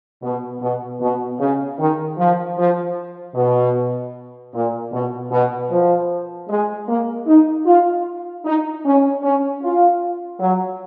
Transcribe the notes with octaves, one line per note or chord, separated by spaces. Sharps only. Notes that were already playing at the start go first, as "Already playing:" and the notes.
B2
B2
B2
C#3
D#3
F3
F3
B2
A#2
B2
B2
F3
G#3
A#3
D#4
F4
D#4
C#4
C#4
F4
F#3